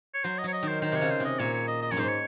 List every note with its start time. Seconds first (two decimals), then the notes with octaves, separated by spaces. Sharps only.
0.15 C#5
0.24 F#3 C5
0.38 D#5
0.44 F#3 C#5
0.53 D#5
0.63 D#3
0.68 C5
0.81 D#3 C5
0.92 C3 C#5
1.01 C#3
1.10 C5
1.20 C3
1.25 D#5
1.39 A#2 C#5
1.54 C#5
1.68 D#5
1.82 D#5
1.91 F#2 C#5
1.97 G#2 C5
2.08 C#5